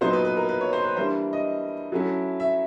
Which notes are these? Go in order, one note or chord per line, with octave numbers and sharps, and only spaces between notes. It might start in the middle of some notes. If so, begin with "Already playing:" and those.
A#2 F#3 B3 D#4 C5
B4
B4
A#4
B4
C#5
C5
B4
E3 G3 A#3 D4 C5
D#5
F#3 A3 C#4 E4
E5